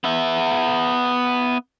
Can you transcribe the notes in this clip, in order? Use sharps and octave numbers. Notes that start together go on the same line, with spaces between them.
B3 E5